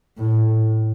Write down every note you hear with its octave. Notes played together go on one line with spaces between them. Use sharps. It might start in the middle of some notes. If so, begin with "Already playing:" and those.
A2